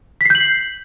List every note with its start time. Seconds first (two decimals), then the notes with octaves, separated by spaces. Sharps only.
0.21 B6
0.25 C7
0.30 G6
0.35 F#7